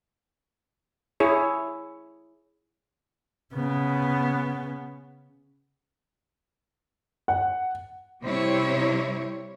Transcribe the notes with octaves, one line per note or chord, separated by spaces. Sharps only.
E4 G#4 C#5
C#3 B3
F#5
C3 G3 C4 E4 C#5